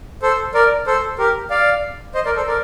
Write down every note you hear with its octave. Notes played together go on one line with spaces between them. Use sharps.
A4 C5
A#4 D5
A4 C5
G4 A#4
D5 F5
C5 D#5
A#4 D5
A4 C5
A#4 D5